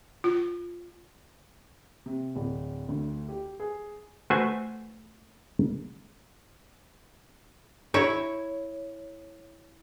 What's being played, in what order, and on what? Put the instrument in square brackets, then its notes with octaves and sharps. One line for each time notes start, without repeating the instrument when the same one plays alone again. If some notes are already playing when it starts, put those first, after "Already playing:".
[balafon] F4
[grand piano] C3
D1
D2
G4
G#4
[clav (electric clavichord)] A3 F#4 B4 C5 F#5 G#5
[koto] E4 C#5